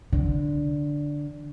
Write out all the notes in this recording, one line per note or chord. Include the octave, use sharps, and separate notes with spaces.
D3